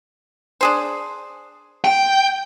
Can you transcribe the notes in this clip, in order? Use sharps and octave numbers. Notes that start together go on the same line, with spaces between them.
D4 G#4 C5
G5